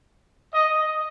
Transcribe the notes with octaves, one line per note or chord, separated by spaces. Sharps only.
D#5